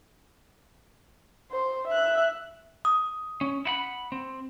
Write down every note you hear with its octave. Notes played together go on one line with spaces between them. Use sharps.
C5
E5 F#6
D#6
C#4
E4 F#5 B5
C4